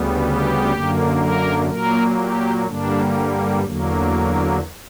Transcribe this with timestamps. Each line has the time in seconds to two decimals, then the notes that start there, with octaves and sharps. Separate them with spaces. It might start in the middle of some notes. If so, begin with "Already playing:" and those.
Already playing: D2 C#3 G3 B3
0.22 G4
0.72 F#2 D3 A#3
1.20 A#4
1.69 A#2 F#3 A#3 A#4
2.19 G4
2.66 G2 D3 G3 A#3 D4
3.64 E2 D3 F#3 A#3